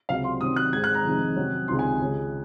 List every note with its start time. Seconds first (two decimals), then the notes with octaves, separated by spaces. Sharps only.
0.09 C#2 C3 F#3 F5
0.24 C6
0.41 C3 D#3 F#3 C#4 D#6
0.56 F#6
0.73 G#2 D#3 G#3 C4 G#6
0.84 F#6
0.95 A#5
1.05 F2 C3 D#3 G#3
1.36 C3 F#3 C#4
1.68 C#2 C3 D#3 C6
1.79 G#5
2.01 C#2 C#3 G#3 C#4